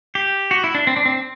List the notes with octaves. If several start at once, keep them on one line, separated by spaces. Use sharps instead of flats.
G4
F#4
E4
D4
C4
D4
C4